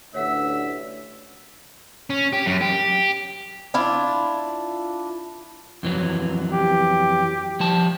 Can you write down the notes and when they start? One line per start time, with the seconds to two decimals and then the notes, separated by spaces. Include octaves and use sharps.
0.14 A1 D2 C#5 E5 F#5 E6
2.10 C#4
2.33 G4
2.46 F#2
2.61 G4
3.74 D4 E4 F4
5.83 F2 E3 F#3
6.53 G4
7.60 F3 G3 A5